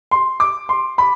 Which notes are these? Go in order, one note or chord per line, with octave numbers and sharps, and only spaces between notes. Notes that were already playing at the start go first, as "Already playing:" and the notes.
C6
D6
C6
B5